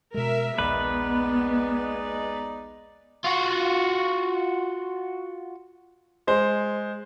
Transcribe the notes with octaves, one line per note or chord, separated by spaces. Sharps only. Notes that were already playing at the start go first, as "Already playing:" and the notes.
B2 G#3 A#4 E5
A#1 D#2 G#3 B3 D#4 B4 D5
F4 F#4
G#3 C5